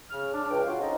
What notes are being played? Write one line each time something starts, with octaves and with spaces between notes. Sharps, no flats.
C#3 F6
D4
C#2 G5
A2 F4 F#4 F5
C4 C#4 D#4 A4 C5 D#5